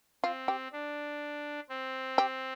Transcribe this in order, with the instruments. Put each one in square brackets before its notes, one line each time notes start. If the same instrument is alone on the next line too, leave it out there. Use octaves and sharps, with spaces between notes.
[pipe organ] C4 [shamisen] F4
[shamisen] G4
[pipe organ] D4
C4
[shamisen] G4